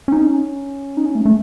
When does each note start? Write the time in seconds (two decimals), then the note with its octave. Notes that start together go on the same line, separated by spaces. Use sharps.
0.08 C#4
0.12 D#4
0.27 C#4
0.97 D#4
1.06 C#4
1.15 A3
1.26 A3